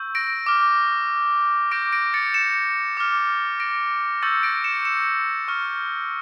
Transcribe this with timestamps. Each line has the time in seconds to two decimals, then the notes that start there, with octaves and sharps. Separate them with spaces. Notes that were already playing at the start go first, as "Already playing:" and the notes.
Already playing: C#6 E6 G6
0.15 A#6 D7
0.46 D6 F6
1.71 D6 G6 A#6 D7
1.93 A#6 D7
2.14 A6 C#7
2.34 C#7 E7
2.97 D6 F6
3.60 A#6 D7
4.22 C#6 E6 G6 A6 C#7
4.43 A#6 D7
4.64 C#7 E7
4.85 C#7 E7
5.48 C#6 F6